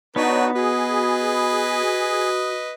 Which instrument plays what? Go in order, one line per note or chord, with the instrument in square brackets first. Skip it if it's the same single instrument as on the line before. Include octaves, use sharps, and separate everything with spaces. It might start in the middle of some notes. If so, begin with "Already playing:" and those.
[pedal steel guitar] B3 [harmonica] D4 B4 [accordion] D#4 F#4 [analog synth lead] C#5
[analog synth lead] F#4 [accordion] G#4 [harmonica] B4 D#5